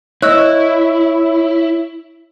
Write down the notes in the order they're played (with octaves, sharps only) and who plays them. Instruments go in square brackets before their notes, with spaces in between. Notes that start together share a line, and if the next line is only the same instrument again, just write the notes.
[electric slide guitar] E4 [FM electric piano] C#5 [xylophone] D#5 E6 F#6